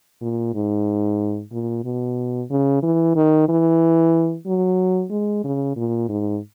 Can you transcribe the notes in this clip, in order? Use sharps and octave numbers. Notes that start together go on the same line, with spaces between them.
A#2
G#2
A#2
B2
C#3
E3
D#3
E3
F#3
G#3
C#3
A#2
G#2